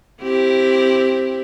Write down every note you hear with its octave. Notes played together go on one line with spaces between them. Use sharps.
C4 E4 G4